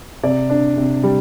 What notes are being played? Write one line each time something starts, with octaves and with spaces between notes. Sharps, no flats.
C3 D5
D4
C3
G3